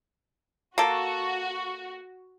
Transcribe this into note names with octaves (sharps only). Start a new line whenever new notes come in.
A#3 F#4 A4